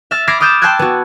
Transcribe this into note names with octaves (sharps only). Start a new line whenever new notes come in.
E5 E6 F6 A6
B5 D6 F6 G#6 A#6 C7
D6 D#6 F6 G6 A6 E7
G5 A5 C6 E6 F#6 G#6
B3 F#4